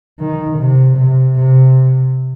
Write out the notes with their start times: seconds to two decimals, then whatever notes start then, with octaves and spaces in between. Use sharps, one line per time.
0.20 D#3
0.58 C3
0.97 C3
1.36 C3